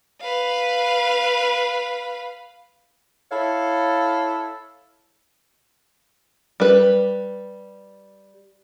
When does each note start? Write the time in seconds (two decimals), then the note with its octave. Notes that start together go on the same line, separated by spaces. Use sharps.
0.21 B4 F5
3.32 E4 A4 C#5 F5
6.60 G3 B4